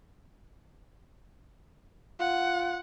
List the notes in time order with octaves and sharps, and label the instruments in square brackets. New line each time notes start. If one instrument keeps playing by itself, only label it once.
[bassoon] F4 [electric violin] F#5